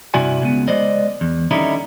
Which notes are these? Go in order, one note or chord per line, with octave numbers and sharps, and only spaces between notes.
G2 C3 E4 F#4 D5 G#5
C#2 B3
G#3 C5 D5 D#5
E2
D3 D#3 G3 C#4 D#4 E4